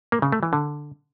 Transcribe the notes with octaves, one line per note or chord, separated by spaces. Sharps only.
A#3
C#3
A3
E3
D3